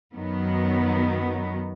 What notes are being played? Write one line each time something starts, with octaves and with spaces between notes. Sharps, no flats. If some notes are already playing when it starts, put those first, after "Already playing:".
F#2 D#3 F#3 B3